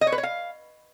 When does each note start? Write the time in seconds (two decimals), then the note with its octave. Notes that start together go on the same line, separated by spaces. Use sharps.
0.01 D#5
0.07 C#5
0.12 B4
0.18 C#5
0.23 F5